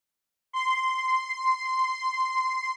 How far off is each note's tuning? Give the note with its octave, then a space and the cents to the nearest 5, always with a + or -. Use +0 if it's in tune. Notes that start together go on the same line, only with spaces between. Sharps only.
C6 -10